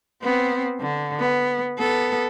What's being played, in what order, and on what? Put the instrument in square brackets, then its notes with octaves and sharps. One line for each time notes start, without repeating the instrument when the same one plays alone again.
[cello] B3 C4
D3
B3
B3 A4